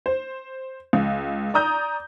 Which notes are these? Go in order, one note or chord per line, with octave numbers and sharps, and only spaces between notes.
C5
C#2
D5 A#5 D#6 G6